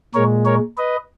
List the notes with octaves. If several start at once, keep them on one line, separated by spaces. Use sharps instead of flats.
A#2 G#3 A#4 C#5
A#4 C#5
B4 D#5